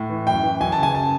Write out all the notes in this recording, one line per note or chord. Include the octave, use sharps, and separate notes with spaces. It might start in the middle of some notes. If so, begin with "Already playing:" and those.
Already playing: A2
E3
F#2 G5
E3
F#2 G#5
A5
C#3 G#5
A5